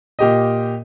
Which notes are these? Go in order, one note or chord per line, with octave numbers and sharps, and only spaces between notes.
A#2 G4 D#5